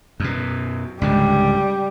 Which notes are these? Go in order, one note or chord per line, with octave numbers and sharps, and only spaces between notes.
F#2 B2
C#2 G#2 D3 G3